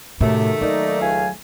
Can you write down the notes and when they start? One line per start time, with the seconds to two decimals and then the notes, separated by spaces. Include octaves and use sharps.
0.21 F#2 A2 C3 D#3 A3
0.61 F#3 A#3 D#4 D5
1.01 C#2 F5 G#5